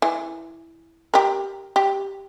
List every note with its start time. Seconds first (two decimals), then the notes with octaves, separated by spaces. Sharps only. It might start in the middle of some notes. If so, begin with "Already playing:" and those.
0.02 E3
1.14 G4 A#4
1.76 G4